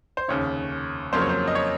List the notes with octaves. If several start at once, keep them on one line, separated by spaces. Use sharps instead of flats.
C5
F1 D#2 C#3 C#5
F2 C#3 F#3 A#3 C5
C#5
C5
D#5
C#5